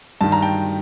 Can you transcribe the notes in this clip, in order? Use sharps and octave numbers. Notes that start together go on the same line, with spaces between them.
G2 D#3 A5
A#5
G5 A5